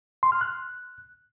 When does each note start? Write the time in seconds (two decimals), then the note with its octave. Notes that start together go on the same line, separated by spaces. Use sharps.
0.23 C6
0.32 F6
0.41 F#6